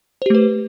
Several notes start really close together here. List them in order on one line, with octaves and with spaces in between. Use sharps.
C5 G4 A3 B4